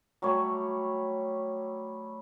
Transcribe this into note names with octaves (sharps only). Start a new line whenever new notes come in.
F#3 G3 A3 C#5